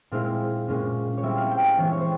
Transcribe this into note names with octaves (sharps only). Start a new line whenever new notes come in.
A#2 G#3 C4 E4 F5
A#2 G#3 C#4 F4
C#5
G3 C4 E4 E5
F5
G5
G#5
E3 G#3 C4 E4 C#5
C#5
C5